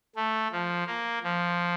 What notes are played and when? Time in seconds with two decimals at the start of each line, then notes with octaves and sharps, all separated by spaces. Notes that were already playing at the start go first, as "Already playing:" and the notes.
0.16 A3
0.51 F3
0.87 A#3
1.23 F3